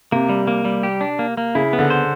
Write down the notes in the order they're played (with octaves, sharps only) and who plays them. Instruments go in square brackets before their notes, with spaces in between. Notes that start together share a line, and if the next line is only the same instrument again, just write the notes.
[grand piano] C3 [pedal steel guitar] A#3
[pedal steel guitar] G3
A#3
G3
G4
D4
A#3
A#3
[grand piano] C#3 [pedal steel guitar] E4
[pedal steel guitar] B3
[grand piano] D3
[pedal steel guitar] C5